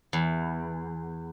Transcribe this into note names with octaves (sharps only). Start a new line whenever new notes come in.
E2